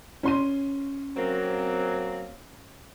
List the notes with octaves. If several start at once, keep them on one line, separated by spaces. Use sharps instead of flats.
C#4 C6 D#7
F#3 A#3 C4